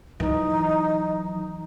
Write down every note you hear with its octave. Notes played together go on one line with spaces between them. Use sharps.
E3 F#3 D#4